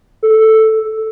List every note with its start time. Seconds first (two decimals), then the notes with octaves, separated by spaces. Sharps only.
0.23 A4